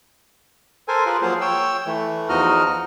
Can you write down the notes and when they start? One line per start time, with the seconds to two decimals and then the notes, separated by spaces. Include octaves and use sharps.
0.88 A4 A#4 C5 G#5
1.06 F4 G#4 A#4 B4
1.22 F3 F#3 A#3 F4 G#4 C5
1.41 C#5 G5 E6
1.86 E3 A3
2.29 E2 F3 D#4 F#4 D#5 F6